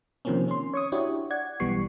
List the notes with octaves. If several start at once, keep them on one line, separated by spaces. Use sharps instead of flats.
C3 D#3 F3 A#3 C4 C#4
C#4 C6
C#5 C#6 D#6
D4 E4 F#4 G4 C#5
D5 F#5 G#6
B1 E3 G3 B3 C#6 C7